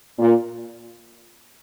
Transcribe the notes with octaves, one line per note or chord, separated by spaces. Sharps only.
A#2